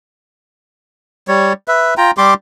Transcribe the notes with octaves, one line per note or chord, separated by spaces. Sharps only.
G3 C#5
B4 E5
F4 G5 A#5
G3 G4 C6 D6